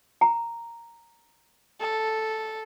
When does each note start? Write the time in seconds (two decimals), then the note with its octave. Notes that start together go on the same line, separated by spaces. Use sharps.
0.21 A#5
1.80 A4